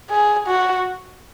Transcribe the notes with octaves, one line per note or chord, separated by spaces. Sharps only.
G#4
F#4